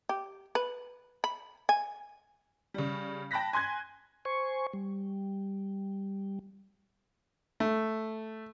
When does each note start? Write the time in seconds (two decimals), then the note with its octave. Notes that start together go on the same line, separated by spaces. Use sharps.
0.09 G4
0.55 B4
1.24 B5
1.69 G#5
2.74 C#3 G3
3.31 G5 A5 B5 F#6 A#6 B6
3.53 G#5 C6 F#6 G#6
4.25 C5 G#5 C#6
4.73 G3
7.60 A3